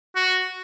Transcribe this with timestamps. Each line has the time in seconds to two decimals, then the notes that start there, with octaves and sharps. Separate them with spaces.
0.16 F#4